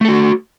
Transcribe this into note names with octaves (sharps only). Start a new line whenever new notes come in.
A3 F#4 A4